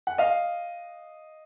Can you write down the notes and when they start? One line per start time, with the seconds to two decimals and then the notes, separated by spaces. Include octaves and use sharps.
0.07 F#5
0.18 D#5 F5